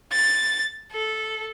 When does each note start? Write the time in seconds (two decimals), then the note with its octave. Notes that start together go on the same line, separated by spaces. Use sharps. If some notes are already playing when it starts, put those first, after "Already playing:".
0.12 A6
0.92 A4